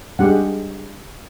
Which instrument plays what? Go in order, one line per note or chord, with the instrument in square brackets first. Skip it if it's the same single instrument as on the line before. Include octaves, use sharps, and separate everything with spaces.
[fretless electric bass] G3 D4 [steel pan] G#3 G4 F#5